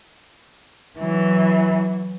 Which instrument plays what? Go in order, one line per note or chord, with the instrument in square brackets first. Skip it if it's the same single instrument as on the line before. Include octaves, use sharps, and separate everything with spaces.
[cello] E3 F#3